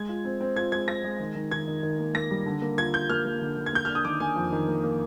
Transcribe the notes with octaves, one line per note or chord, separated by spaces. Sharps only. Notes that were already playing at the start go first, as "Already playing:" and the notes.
Already playing: G#3 G#6
F4
C4
C4
F4 G#6
G#3 G#6
C4 A#6
G#3
D#3
D#3
D#3 G#6
D#3
D#3
A#3
A#3 A#6
G3
D3
A#3
F4 G#6
F4 G6
A#3 F6
A#3
D3
D3
G#6
A#3 G6
D4 F6
D#6
D#3 D6
A#3 G#5
F2
D#3
A#3
A#3